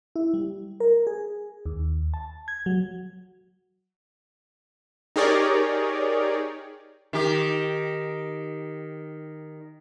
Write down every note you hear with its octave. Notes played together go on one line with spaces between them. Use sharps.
E4
G3
A#4
G#4
D#2
A5
G#6
F#3
D#4 G4 G#4 A#4 C#5 D5
D#3 G4